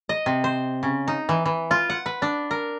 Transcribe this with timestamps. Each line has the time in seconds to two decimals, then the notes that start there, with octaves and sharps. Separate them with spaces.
0.09 D#5
0.26 C3
0.44 C5
0.83 C#3
1.08 D#4
1.29 E3
1.46 E3
1.71 F4
1.90 F#5
2.06 B4
2.22 D4
2.51 A#4